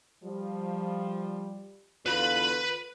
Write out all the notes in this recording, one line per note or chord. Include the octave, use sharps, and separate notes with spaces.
F3 G3
E2 D3 F4 B4 B5